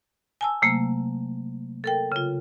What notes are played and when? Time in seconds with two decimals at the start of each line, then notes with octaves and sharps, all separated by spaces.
0.41 G#5 A5 E6
0.62 C3 F#3 A3 A#3
1.84 A4 A#4 G5
2.12 C#3 F4